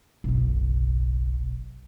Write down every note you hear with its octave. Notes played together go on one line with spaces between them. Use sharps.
F#1 B1